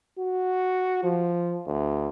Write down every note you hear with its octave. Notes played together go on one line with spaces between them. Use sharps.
F#4
F3
D2